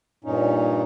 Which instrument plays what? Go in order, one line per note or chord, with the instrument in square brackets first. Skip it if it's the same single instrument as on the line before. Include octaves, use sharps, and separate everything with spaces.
[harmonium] G2 A#2 C#4 D#4